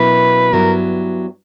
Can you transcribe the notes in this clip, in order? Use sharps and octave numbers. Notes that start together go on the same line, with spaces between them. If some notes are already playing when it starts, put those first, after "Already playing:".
Already playing: B2 F#3 A#3 C#4 E4 B4
G2 F#3 B3 E4 A#4